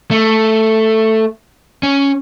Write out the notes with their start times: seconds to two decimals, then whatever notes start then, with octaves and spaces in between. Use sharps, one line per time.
0.11 A3
1.83 C#4